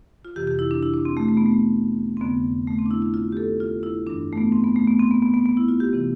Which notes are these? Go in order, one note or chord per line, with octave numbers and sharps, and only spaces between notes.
F4
F2 C3 E3 G4
G4
E4
D4
E4
D4
C4
A3
A3
B3
A3
C4
F2 D3 B3
A3
C4
D4
E4
E4
F4
G4
A4
F4
E4
G2 E3 D4
A3
B3
C4
B3
A3
B3
C4
B3
B3
B3
B3
E4
F4
G4
C3 E3